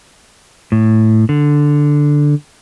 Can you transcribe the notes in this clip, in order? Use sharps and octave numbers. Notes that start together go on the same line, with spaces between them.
A2
D3